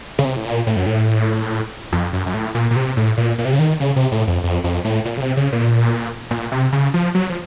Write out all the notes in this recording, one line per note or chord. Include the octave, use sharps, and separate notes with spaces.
C#3
C3
A2
A#2
A2
F#2
A2
F2
F#2
F#2
A2
A#2
A#2
C3
A2
A#2
A#2
C3
C#3
D#3
C#3
C3
A2
F2
F2
F2
A2
A#2
C#3
C3
C#3
A#2
A#2
C3
C#3
F3
F#3
F3